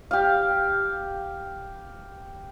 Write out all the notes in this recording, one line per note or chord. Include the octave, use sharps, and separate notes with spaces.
G4 F5